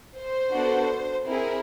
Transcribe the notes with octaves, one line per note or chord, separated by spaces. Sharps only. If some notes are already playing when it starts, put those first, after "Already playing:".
C5
B3 D4 F#4 A4
C4 E4 G#4 A#4